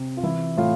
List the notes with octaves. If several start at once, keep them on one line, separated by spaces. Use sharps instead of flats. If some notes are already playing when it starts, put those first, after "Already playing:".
Already playing: C3
F4
E3 E4
A2 F4